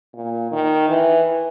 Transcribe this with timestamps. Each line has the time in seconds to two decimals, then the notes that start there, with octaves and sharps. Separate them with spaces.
0.14 A#2
0.52 D#3
0.88 E3